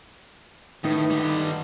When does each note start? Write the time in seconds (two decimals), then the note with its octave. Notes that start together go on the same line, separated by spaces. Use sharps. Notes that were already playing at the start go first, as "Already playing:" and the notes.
0.84 A2 D#3 D#4 B4
1.10 D3 G3